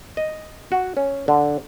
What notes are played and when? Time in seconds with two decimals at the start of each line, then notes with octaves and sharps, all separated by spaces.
0.17 D#5
0.72 F#4
0.97 C#4
1.28 D3